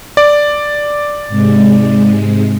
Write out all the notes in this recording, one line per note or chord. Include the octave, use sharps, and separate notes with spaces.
D5
G#2 C3 G#3